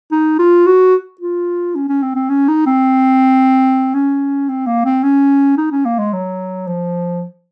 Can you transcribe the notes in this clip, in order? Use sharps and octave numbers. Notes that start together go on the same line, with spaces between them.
D#4
F4
F#4
F4
C#4
C#4
C4
C4
C#4
D#4
C4
C#4
C4
A#3
C4
C#4
D#4
C#4
A#3
G#3
F#3
F3